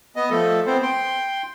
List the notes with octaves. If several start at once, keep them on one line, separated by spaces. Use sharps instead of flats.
B3 D#5
F3 A3 A4
B3 C4 C5
G5 C6